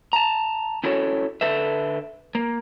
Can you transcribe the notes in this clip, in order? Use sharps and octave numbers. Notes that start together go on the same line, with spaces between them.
A5 A#5
C#4 E4 F#4 A4 C#5
D3 A4 B4 E5
A#3